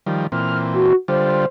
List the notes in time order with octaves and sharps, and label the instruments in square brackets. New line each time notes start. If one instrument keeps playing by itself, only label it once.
[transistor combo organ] D#3 F3 G3
[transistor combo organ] A#2 E3 C4 [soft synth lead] F6
[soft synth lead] F#4
[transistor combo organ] D3 G3 F4 [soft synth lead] C5